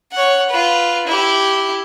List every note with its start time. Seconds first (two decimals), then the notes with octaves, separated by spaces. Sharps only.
0.12 C#5 F#5
0.49 F4 B4
1.07 E4 G4